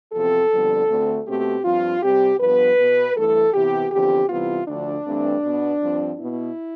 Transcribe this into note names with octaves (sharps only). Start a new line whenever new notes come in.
E2 C3 F3 C4 A4
F2 D3 G3 B3
D2 D3 A3 C4
B2 A3 C4 G4
G2 F3 C4 F4
C3 G3 C4 G4
G2 F3 B3 B4
B2 B3
G2 E3 A3 A4
C3 E3 B3 G4
E2 D3 F3 C4 G4
C3 E3 G3 B3 F4
D2 D3 F3 D4
G2 E3 A3 C4
B2 B3
G2 F3 C4
B2 B3 E4